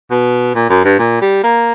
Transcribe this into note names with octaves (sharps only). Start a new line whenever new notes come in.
B2
A#2
F#2
G2
A#2
G3
A#3